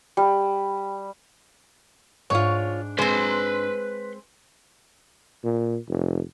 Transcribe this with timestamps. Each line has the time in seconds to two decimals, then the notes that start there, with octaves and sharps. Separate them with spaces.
0.17 G3 G5
2.30 G#2 D4 F4 C#5
2.99 G#3 C4 B4 C6
5.44 A#2
5.88 F1